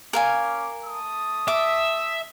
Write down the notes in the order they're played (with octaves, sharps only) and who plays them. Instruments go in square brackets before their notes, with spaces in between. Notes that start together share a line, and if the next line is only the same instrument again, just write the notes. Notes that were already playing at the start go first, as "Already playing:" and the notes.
[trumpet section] A#3 C#4 D6 [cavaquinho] A#4 F5 G#5
[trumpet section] A3 A5 D#6
[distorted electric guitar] E5 [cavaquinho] D6